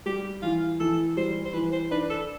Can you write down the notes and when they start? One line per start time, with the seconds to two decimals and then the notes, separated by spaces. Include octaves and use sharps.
0.06 G3 G4
0.43 E3 F4
0.80 E3 A4
1.17 G3 C5
1.45 C5
1.53 E3 B4
1.73 C5
1.91 D4 B4
2.10 A4